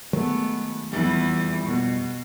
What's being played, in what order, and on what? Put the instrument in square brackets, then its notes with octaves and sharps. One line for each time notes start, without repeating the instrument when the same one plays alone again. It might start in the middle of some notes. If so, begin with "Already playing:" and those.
[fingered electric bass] D#3 F#3 G#3 [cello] A3 B3
[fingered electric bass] F1 G3 [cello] E2 E3
[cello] B2